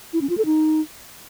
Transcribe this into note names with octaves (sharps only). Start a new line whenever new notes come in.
E4
C#4
F4
A4
D#4